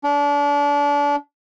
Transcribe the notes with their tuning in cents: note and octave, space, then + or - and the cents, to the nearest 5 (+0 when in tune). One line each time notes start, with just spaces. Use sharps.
D4 -30